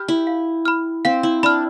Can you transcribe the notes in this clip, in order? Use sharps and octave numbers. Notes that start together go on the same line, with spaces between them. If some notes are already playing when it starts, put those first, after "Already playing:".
Already playing: G4 B5 F6
E4
F5
B5 F6
C4 F5
E4
D4 B5 F6